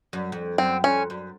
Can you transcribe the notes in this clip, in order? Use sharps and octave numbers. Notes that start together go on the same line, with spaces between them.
F#2
F2
F#2 C4
F2 C#4
F#2